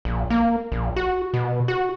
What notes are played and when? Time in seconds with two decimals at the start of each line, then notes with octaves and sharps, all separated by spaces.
0.05 A#1
0.30 A#3
0.72 A#1
0.96 F#4
1.34 B2
1.68 F#4